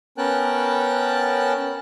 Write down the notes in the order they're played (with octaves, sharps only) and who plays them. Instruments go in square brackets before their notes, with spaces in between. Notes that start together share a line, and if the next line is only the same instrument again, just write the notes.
[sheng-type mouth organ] B3 C#4 A#4 G5 A5 F#6